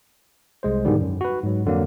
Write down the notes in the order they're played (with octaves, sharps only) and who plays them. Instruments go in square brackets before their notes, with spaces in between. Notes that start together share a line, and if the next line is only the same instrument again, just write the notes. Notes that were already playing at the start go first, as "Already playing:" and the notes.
[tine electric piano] C2 G#3 C5
G#2 B2 D3 D#3 G3
F#2
F#4 B4
G#2 F#3
F2 D3 F#3 A#3